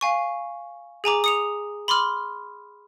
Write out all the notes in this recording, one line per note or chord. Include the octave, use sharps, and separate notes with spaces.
F5 G#5 C#6
G#4 G#5 A#5 D6
D#6 C#7 F7
B5 C6 D6 F6